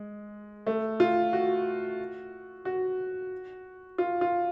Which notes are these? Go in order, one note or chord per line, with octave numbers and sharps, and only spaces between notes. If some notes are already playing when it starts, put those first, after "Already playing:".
Already playing: G#3
A3
F4
F#4
F#4
F4
F4